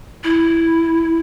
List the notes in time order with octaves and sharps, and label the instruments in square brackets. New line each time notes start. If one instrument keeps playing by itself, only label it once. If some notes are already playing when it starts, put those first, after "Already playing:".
[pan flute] E4